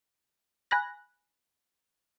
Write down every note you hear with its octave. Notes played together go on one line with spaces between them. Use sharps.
G#5 B5 F#6 A#6